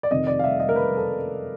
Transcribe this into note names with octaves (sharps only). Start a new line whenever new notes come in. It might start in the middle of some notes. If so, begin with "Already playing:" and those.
D5
F2 C3 D#3 D#5
D5
F5
E5
D#5
A#4
B4
A4